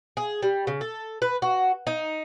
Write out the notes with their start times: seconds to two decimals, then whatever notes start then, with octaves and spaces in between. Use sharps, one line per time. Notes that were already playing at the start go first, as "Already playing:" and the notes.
0.17 G#4
0.42 G3
0.67 C#3
0.81 A4
1.22 B4
1.42 F#4
1.87 D#4